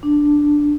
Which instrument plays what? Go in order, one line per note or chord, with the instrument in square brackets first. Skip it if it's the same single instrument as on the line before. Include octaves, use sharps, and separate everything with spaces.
[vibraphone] D4